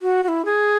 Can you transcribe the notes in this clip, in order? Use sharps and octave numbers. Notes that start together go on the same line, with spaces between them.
F#4
F#4
E4
G#4